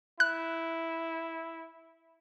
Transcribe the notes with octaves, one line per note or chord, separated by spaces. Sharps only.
E4 F#6